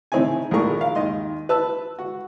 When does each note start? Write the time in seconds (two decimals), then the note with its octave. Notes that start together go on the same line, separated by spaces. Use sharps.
0.12 A2 E3 C4 D#4 E4 G#5
0.51 A#1 A2 D#3 G#4 A#4 C#6
0.81 F5
0.95 D#2 D#3 D#5 C6
1.49 B4 A5 E6
1.99 F#4